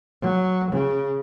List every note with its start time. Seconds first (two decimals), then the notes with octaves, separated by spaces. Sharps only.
0.22 F#3
0.71 C#3